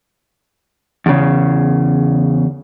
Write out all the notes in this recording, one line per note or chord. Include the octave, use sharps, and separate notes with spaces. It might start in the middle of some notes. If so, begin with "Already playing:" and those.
E2 C#3